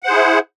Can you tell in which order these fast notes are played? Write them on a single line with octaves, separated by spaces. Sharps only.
F#5 C5 G#4 E4